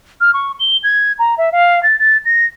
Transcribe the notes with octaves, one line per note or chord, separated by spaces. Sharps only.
F6
C#6
G7
G#6
A#5
E5
F5
A6
A6
A#6